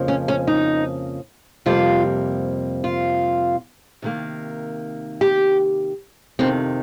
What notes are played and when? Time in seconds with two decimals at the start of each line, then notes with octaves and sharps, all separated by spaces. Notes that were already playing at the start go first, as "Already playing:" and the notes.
Already playing: F2 C#3 F3 A#3
0.08 C#4
0.28 C#4
0.47 D#4
1.66 F2 C3 G3 A#3 F4
2.84 F4
4.02 C3 D#3 A#3
5.21 G4
6.39 F2 C3 D#3 C4